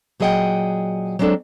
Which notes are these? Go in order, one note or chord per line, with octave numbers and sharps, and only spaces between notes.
A#2 F#3 G#4 D#5 F#5 G5
F#3 G#3 C4 D4 A4